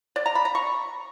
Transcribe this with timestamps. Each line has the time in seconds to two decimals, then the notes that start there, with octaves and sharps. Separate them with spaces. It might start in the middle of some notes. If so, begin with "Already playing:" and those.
0.16 D5
0.26 A#5
0.35 B5
0.45 A#5
0.55 C#6